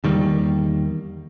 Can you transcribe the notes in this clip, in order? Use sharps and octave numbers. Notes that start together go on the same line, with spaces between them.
E2 D#3 G3 A#3